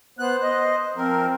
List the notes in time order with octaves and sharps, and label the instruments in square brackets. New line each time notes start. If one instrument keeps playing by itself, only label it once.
[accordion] B3 F#6 [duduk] C5
[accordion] D#5
[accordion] F3 A#4 [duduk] C4